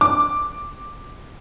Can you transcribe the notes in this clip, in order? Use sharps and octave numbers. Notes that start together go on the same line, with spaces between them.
D6